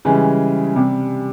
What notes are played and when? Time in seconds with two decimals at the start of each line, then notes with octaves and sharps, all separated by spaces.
0.05 C#3 E3 G3 G#3 C#4 G4
0.76 C3 G3